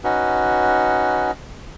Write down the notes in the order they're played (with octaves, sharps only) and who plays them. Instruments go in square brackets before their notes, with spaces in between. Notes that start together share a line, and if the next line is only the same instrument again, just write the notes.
[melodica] C#4 D#4 F#4 B4